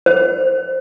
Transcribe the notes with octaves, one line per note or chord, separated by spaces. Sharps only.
C5